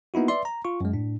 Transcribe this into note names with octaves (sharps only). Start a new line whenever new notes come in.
A#3 B3 D#4 E4 F#4
B4 D5 E5 C6
A#5
F4 C#6
F#2 G#3
A2 D4